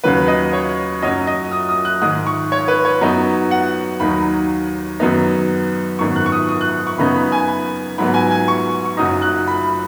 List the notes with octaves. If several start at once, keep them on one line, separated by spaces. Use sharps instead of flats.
D#2 C#3 F#3 C#4 B4
D#5
C#5
F#2 F#3 C#4 D#5
D#5
D#6
D#6
F#6
G#2 D#3 G#3 D#6
C#6
C#5
B4
C#5
F#2 F#3 B3 D#4
F#5
D#2 D#3 F#3 D#4 B5
F#2 D#3 F#3 B3 D#4
G#1 F#2 D#3 B3 C#6
F#6
C#6
D#6
D#6
F#6
C#6
F#2 C#3 B3 D#4 B5
B5
G#5
B5
G#2 F#3 B3 B5
G#5
G#5
C#6
C#6
F#1 F#2 F#3 D#4 D#6
F#6
B5
B5